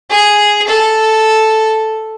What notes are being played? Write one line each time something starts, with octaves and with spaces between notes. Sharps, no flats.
G#4
A4